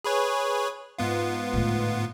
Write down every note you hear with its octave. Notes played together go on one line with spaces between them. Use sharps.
G#4 B4 C#5
G#2 B3 F4
A2 D3